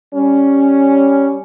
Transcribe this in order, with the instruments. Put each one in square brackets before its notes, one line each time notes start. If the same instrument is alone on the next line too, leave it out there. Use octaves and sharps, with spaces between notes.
[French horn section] G3 C#4